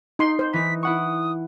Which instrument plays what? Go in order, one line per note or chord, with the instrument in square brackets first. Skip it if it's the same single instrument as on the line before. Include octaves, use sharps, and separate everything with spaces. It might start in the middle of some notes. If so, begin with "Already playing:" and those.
[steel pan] D#4 C6
C5
[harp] E3 D#4 [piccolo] B6
[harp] E4 F#5 C#6 [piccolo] D#6